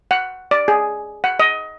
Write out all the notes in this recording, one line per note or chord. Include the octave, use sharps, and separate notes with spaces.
F#5
D5
G#4
F#5
D#5